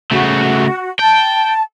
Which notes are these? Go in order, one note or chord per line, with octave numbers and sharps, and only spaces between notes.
C#3 A3 F#4
G5 A5